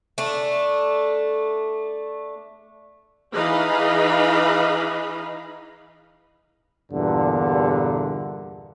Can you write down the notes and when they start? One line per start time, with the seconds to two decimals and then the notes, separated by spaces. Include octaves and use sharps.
0.18 A3 D4
3.33 E3 D#4 G#4 D#5 F5 B5
6.92 E2 G2 A#2 D3